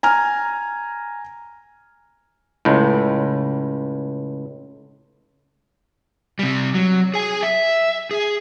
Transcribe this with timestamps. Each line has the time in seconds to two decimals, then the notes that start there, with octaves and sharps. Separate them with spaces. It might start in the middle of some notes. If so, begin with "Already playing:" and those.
0.03 G#5 A#5 F6
2.65 C#2 A2
6.39 C3 G3
6.74 F#3
7.14 G#4 G#5
7.43 E5
8.11 G#4